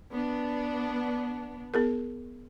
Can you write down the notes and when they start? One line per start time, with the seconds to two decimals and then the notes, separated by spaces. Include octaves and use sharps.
0.12 B3 D4
1.74 B3 G#4 A#4